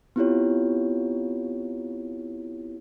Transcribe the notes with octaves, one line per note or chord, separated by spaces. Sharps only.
B3 C4 E4 F4 G4 C#5